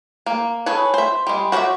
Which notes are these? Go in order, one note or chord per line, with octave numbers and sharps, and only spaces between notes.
A#3
G#4 A4 B4 C#5
C5 E5
G3 G#3
F#4 A#4 C5 D5 E5